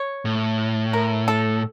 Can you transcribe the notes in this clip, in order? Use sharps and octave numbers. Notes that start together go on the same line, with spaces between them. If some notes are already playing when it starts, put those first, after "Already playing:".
Already playing: C#5
A2
A#4
A4